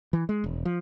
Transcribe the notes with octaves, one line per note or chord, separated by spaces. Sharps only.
E3
G#3
E1
F3